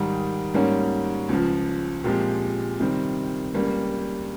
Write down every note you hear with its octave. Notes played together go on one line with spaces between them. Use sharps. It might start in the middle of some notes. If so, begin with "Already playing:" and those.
Already playing: G#2 D#3 G3
G#2 G3 A#3 C#4
C#2 C#3 F3
A#2 F3 G#3 C4 G4
C3 D#3 G3 C4
C#2 C#3 G3 A#3